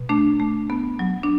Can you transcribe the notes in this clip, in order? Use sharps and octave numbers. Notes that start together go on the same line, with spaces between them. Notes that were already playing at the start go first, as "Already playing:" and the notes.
Already playing: B2
A3 D4
A3
B3
F#3
D4